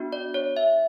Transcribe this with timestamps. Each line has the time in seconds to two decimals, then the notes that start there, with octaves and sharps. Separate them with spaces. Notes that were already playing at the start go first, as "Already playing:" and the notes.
Already playing: B3 D4 F#4
0.13 D5
0.34 C#5
0.57 E5